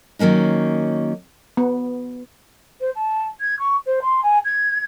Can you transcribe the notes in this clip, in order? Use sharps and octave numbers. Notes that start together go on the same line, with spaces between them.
D#3 F#3 A#3 C#4 D#4
B3
C5
A5
G#6
C#6
C5
C6
G#5
G#6